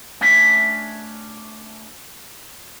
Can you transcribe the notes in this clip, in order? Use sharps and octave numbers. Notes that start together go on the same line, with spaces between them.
A3 C#4 D4 C#5 E5